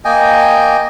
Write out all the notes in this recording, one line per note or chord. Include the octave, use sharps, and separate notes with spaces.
A#3 D#5 G5 G#5